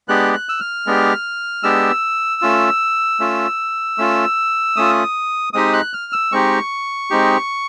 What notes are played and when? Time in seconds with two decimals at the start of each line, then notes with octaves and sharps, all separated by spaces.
0.08 G#3 B3 D4 G4 F#6
0.33 F#6
0.49 E6
0.60 F6
0.86 G#3 B3 D4 G4
1.63 G#3 B3 D4 G4 E6
2.42 A3 C#4 F4
3.20 A3 C#4 F4
3.98 A3 C#4 F4
4.76 A3 C#4 F4 D#6
5.53 G#3 C4 D#4 G4 D#6
5.73 F#6
5.93 F6
6.13 E6
6.32 G#3 C4 D#4 G4 C#6
7.10 G#3 C4 D#4 G4